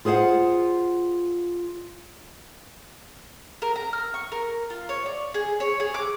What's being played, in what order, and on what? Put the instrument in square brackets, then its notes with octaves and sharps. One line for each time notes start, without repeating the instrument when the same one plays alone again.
[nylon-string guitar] F4 G#4 C5 F5 F#5
[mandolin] A#4
A#5
F6
C#6
A#4
F4
C#5
D5
G#4
C#5
G#4
D6